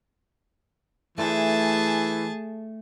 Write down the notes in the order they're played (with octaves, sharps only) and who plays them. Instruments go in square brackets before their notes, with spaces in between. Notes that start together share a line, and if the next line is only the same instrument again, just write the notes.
[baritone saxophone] E3 [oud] A3 D4 F4 [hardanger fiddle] G#4 A5